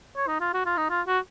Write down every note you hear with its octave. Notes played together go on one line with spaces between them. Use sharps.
C#5
D#4
F4
F#4
F4
D#4
F4
F#4